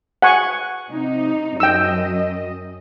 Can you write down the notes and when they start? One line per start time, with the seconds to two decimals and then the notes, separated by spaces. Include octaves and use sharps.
0.22 F#5 G#5 C#6
0.91 C3 D#4
1.60 F#2 D#5 G5 E6